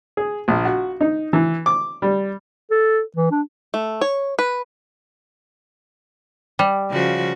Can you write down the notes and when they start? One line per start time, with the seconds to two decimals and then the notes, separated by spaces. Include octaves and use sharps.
0.17 G#4
0.48 A#1
0.65 F#4
1.01 D#4
1.33 E3
1.66 D6
2.02 G3
2.71 A4
3.16 E3
3.31 D4
3.74 A3
4.01 C#5
4.39 B4
6.59 G3
6.90 C#3 F3 F#4